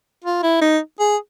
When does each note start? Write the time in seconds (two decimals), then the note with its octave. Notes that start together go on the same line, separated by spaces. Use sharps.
0.24 F4
0.43 E4
0.62 D#4
1.00 G#4